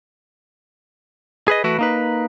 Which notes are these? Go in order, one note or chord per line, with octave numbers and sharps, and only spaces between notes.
G#4 B4 D#5
E3 A3 E4 F#4 B4
A#3 D#4 B4